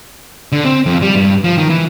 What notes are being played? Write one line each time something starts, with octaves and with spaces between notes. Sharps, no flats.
D3
C4
F2
G3
G2
F3
D#3
E3